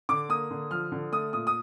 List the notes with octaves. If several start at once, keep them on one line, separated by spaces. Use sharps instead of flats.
D3 D6
A#3 D#6
D3
F3 F6
D3
A3 D#6
A#2 D#6
D#6